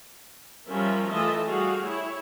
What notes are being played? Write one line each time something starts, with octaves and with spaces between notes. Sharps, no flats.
F3 G3 C#4 F4 A#4 E5
E3 A3 F4 D#5 E5 A5
G3 A3 F#4 G#4 F5
E4 C#5